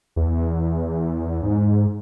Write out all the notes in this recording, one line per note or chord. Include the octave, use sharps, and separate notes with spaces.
E2
G#2